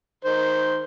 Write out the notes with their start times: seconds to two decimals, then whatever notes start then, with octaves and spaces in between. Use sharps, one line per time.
0.24 D#3 C5